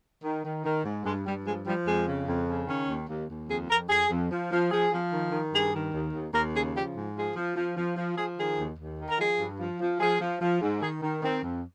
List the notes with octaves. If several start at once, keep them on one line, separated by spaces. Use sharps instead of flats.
D#3
D#3
D#3
G#2
G2 G#3
G2 G3
F3 G#3
F3 G3
F2 G#3
C#3
F2
C#3
D#3 C#4
D#2
D#2
D#2
F2 G#4
F2 A#4
F2 G#4
F2
F3
F3
F3 G#4
F3
D#3
D#3
G2 G#4
D#3
D#2
D#2
D#2 A#4
C#3 G#4
F3 G4
G#2
F3 G#4
F3
F3
F3
F3
F3 G#4
D#3 G#4
D#2
D#2
D#3
A#4
F3 G#4
G2
F3
F3
F3 G#4
F3
F3
G#2
D#3 G#4
D#3
D#3 C4
F2